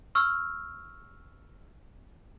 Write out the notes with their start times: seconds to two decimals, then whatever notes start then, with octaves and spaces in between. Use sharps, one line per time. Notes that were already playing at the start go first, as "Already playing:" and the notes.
0.15 C#6 E6 F6